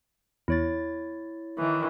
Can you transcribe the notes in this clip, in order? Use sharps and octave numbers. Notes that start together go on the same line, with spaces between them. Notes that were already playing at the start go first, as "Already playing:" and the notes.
E2 E4 C#5 A6
D#3 E3